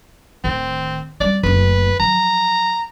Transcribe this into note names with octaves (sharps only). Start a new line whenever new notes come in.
D1 D#3 C4
G3 C4 D5
F#1 D2 B4
F3 F#3 A#5